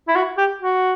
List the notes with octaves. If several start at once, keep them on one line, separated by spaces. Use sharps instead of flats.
E4
F#4
G4
F#4